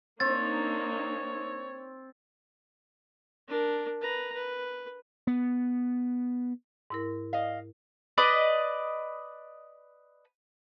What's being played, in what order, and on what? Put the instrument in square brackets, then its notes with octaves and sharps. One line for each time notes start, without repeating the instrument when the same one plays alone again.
[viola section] A#3 D4 D#4 [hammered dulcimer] C4 [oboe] C#5 [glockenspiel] A6
[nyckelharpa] D4 A#4
B4 A#5
B4
[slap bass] B3
[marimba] G#2 E4 A#4
[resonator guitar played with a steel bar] D#5 F5
[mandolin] B4 D5 D#5